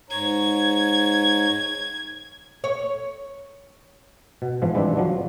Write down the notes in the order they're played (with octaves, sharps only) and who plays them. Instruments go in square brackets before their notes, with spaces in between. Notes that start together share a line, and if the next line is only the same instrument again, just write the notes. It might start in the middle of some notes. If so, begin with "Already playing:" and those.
[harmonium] G#2 C#5 A#5 [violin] G#6
[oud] C#5
[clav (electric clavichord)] B2
G#2 E3 F3
E3 G3 G#3 C4 D4
F3 F#3 D4